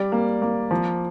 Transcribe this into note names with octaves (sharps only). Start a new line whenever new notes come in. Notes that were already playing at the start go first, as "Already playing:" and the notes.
Already playing: G3 D5
A#3
A#3
F3